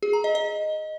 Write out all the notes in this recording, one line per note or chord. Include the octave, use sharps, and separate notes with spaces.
G#4
A#5
D#5
D#5